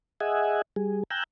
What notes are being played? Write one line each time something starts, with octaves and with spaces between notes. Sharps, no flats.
G#4 D#5 E5 F#5 G#5
G3 G#4
G5 G#5 A#5 E6 F#6 G6